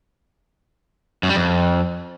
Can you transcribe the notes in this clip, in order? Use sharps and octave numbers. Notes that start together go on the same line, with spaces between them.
F#2
G3
F2